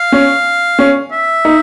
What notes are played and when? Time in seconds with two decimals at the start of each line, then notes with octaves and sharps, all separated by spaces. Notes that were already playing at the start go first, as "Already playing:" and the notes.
Already playing: F5
0.12 C#4
0.79 C#4
1.12 E5
1.45 D#4